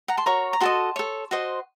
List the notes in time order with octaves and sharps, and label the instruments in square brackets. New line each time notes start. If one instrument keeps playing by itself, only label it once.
[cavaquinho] F#5 A#5
A5 C6
F#4 A#4 C#5 A#5 C#6
A#5
F#4 A4 D#5 A5 C6
A4 C#5
F#4 C5 D#5